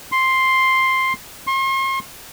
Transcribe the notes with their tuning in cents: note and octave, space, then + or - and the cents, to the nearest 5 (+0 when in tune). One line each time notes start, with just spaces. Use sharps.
C6 +5
C6 +40